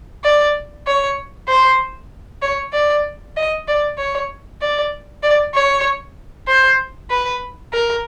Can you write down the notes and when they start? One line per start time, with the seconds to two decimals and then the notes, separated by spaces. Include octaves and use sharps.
0.24 D5
0.87 C#5
1.49 C5
2.42 C#5
2.73 D5
3.37 D#5
3.68 D5
3.98 C#5
4.62 D5
5.23 D5
5.54 C#5
6.48 C5
7.10 B4
7.73 A#4